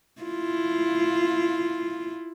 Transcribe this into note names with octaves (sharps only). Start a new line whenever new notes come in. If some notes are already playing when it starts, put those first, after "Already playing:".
E4 F4